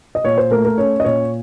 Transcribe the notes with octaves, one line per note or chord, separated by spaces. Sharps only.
D#5
A#2 C#5
C5
A3 A#4
A#4
C#4 C#5
D#5
A#2 C#5